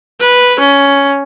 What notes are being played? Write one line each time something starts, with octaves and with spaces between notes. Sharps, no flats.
B4
C#4